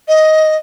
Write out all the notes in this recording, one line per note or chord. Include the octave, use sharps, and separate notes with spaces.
D#5